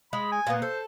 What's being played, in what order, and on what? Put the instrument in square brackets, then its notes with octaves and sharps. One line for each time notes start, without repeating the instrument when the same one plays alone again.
[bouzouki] G#3 [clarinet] B5
[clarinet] G#5
[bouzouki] A#2 A#3 B3
[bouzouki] A4 [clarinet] C5